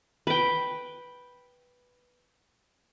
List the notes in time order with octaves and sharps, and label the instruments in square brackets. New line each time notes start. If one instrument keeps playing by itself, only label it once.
[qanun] B4 G5